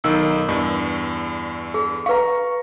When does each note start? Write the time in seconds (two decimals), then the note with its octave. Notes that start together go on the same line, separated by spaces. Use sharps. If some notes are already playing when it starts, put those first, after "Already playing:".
0.04 B1 D#3 E6
0.48 E2 G2
1.74 G#4
2.06 B4 F5 A#5 C#6